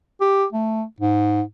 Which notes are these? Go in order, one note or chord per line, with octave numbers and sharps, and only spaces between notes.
G4
A3
G#2